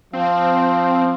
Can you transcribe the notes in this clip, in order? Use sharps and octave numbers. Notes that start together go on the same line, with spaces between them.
F3 C4 F5